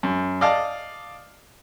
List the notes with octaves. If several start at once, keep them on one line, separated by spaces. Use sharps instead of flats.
F#2
D5 D#5 F5 A5